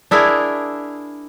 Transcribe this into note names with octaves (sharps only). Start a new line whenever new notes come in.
D4 E4 G#4 A#4